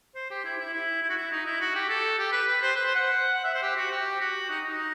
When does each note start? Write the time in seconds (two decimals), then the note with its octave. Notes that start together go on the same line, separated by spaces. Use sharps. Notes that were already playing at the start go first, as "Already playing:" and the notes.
0.15 C5
0.30 G4
0.44 E4
0.59 E4
0.73 E4
1.02 E4
1.09 F#4
1.17 E4
1.32 D#4
1.46 E4
1.60 F#4
1.75 G4
1.89 A4
2.18 G4
2.32 B4
2.47 B4
2.62 C5
2.76 B4
2.85 C5
2.95 F#5
3.34 F#5
3.44 E5
3.54 C5
3.63 G4
3.77 F#4
3.91 G4
4.21 F#4
4.50 D#4
4.69 D#4